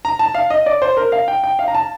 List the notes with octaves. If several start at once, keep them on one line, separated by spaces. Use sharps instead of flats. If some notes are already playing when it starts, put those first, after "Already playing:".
A#5
A5
F5
D#5
D5
C5
A#4
F5
G5
G5
F5
A#5
A5